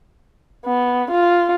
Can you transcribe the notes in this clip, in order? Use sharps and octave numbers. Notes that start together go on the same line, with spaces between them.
B3
F4